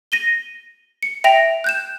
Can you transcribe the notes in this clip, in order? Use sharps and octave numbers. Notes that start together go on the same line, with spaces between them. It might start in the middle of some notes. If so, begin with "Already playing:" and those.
A#6 D#7 G7
C#7
E5 G5 A#6 D7 F7
F#6 G6 E7